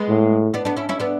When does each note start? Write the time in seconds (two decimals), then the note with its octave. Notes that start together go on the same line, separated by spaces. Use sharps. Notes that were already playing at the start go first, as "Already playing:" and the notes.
Already playing: G#3 B3
0.09 A2
0.54 B3 D4
0.65 B3 D4
0.77 C#4 E4
0.89 C#4 E4
1.00 B3 D4